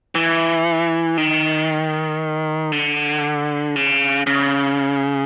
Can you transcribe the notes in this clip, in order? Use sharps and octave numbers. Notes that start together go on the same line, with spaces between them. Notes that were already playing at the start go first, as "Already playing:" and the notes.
E3
D#3
D3
C#3
C#3